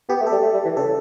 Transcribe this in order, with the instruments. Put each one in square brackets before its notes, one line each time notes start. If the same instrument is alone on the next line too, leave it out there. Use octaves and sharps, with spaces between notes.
[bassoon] B3 [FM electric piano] G4
[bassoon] A3
[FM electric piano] A4
[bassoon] G3
A3
G3
E3
[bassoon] C#3 [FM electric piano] A4